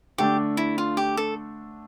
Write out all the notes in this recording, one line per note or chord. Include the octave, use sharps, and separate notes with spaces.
D3 A3 D4 G4
E4
F4
G4
A4